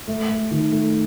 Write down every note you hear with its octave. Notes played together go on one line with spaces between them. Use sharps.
A3
A3
D#3
A3